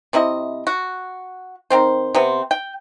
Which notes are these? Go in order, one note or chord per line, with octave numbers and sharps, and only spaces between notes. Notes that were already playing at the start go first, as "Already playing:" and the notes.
C3 C4 E4 D#5
F#4
D#3 C4 C5
C3 B3 C4
G5